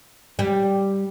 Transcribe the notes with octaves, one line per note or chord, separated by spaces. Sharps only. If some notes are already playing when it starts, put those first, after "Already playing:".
G3